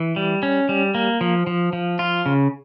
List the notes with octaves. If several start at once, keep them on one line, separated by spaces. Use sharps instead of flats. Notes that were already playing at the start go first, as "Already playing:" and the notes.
Already playing: E3
G3
C#4
G3
A#3
F3
F3
F3
F4
C#3